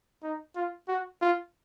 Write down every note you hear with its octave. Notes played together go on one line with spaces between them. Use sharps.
D#4
F4
F#4
F4